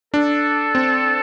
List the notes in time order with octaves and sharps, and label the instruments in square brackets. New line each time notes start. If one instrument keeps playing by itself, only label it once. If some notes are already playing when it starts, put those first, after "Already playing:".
[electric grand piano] D4 [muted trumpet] A4
[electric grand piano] C4